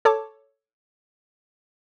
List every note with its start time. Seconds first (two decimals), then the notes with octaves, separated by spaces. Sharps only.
0.05 A4 C#5 A5 D6